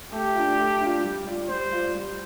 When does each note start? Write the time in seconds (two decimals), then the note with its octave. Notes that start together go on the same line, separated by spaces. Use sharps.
0.12 A3 G4
0.35 D4 F4
0.57 A3
0.81 D4 F4
1.04 G3
1.27 F4 D5
1.49 G3 C5
1.72 F4 D5
1.95 G3